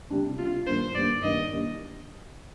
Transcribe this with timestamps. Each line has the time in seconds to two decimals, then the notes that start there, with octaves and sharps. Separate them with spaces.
0.10 C3 G3 D4
0.38 C3 G3 D4 F4
0.67 G2 D#3 G3 A#3 D4 C5
0.95 G2 D#3 G3 A#3 D4 D5
1.23 G2 D#3 G3 A#3 D4 D#5
1.51 D#3 G3 A#3 D4